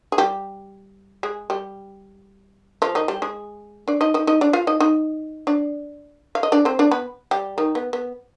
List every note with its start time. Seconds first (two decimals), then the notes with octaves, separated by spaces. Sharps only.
0.12 G#4
0.18 G3 G4
1.23 G#3 G#4
1.50 G3 G4
2.82 F3 F4
2.95 D#3 D#4
3.08 G3 G4
3.22 G#3 G#4
3.88 D4 D5
4.01 D#4 D#5
4.14 D#4 D#5
4.27 D#4 D#5
4.41 D4 D5
4.53 F4 F5
4.67 D#4 D#5
4.80 D#4 D#5
5.47 D4 D5
6.35 F5
6.43 D#5
6.52 D4 D5
6.65 C4 C5
6.79 D4 D5
6.91 B3 B4
7.31 G3 G4
7.58 D#3 D#4
7.75 B3
7.93 B3